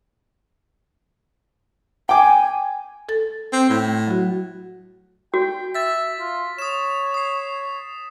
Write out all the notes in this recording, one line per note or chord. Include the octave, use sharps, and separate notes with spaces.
G5 G#5 D6
A4 A6
C4
A2
F#3 F#4
F#4 G5
E5 A6 B6
F4
C#5 D#6 E7
D#6 C7